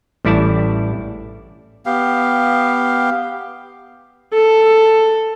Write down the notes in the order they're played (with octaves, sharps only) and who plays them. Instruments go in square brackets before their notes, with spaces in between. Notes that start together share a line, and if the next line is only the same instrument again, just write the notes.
[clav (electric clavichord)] A1 G3 E4 D5 A5
[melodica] B3 G4 F5
[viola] A4